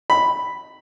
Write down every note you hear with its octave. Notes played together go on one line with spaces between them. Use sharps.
B5